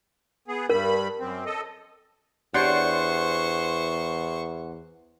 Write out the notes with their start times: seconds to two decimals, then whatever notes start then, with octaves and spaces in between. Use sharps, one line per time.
0.48 B3 G#4
0.70 G2 G3 A#4 B5
1.19 F#2 C4
1.45 A4 D#5
2.54 E2 D4 G4 C5 C#5 F#5 C6 C#6